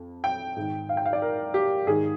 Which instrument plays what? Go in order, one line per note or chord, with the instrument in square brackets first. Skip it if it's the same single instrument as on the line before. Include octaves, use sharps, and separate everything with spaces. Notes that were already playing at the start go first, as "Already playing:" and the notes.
Already playing: [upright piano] F2
G5
G#2 D#3
F5
G5
F5
D5
A#4
G4
G#2 D#3 G#4